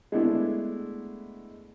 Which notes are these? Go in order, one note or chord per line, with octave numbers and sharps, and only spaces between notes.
G#3 A3 B3 D4 E4 A4